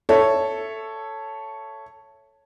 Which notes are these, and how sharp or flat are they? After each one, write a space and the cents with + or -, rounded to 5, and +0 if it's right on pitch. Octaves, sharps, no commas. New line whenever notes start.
A4 +0 C#5 +0 E5 +10